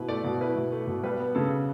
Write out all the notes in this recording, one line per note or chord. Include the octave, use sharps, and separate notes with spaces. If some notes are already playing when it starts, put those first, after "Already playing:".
Already playing: B2 E4 B4
A3 D5
B2
E4 B4
B2
A3
B2
G3 B4
B3
C#3 A4